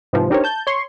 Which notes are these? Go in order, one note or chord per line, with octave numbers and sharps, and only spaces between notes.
G#2 C3 E3 F3
D4 D#4 G4 A#4 C5 C#5
A5 G6
C#5 C6 C#6